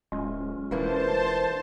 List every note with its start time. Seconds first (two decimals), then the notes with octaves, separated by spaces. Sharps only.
0.12 D1 G#3 C#4 F4
0.71 E1 E3 A#3 D4 C5 A5